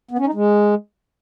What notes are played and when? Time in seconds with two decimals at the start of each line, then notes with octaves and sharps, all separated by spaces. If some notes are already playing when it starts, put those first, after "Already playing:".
0.11 B3
0.19 C#4
0.26 D#4
0.34 G#3